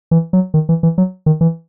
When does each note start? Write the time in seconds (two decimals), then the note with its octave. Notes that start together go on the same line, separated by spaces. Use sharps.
0.11 E3
0.33 F#3
0.54 D#3
0.69 E3
0.83 E3
0.98 F#3
1.26 D#3
1.41 E3